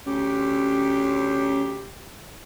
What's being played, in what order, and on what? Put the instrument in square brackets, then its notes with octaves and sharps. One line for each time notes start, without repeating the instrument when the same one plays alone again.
[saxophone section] D2 G4 [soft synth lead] C#4